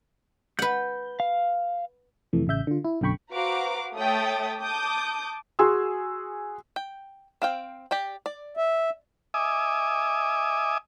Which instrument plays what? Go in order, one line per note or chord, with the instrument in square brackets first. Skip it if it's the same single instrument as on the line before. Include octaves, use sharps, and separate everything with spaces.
[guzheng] B4 F#5 [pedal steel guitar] G6
[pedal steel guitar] F5
[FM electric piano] F2 C3 E3 A3
A1 C#3 E5 G6
D3 F4
E4
B1 F#2 D3 G5 B5 C#6
[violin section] F#4 B4 C5 F5 A#5 D6
A3 C#5 E5 G5 D#6 A6
A5 D6 D#6 G6
[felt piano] F#4 G#4 G#5 C6 E6
[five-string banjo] G5
C4 F5 G5
G4 D5 G5
D5
[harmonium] E5
[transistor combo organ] D#5 E5 G#5 D6 D#6